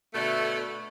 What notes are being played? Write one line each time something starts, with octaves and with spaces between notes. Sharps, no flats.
B2 D3 A3